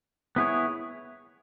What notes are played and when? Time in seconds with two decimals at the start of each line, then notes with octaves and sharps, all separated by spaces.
0.36 B3 E4 G#4 C#5